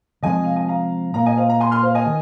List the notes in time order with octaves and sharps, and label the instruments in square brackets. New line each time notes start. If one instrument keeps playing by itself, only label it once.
[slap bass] C3 F3 G#3 C4 [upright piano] D#5 G#5
[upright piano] F5
G#5
F5 A#5
[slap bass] A#2 A#3 [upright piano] F5 A#5
[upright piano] D#5 G#5
C5 F5
F5 A#5
G#5 C6
C6 F6
C5 F5
D#5 G#5
[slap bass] D#3